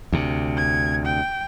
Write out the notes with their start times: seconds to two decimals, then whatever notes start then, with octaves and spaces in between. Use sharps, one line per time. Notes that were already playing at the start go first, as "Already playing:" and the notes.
0.12 D2 C3
0.57 G#6
1.06 G5